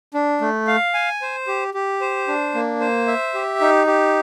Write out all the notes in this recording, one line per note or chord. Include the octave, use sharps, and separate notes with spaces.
D4
A3
F5
G#5
C5
G4
G4
C5
D4
A#3
C5
E5
G4
D#4
G4